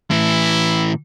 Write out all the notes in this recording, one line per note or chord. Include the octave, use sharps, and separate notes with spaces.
A2 E3 E4